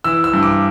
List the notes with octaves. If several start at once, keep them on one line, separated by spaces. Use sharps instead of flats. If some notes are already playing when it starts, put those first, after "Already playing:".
E3 E6
E6
G2
D6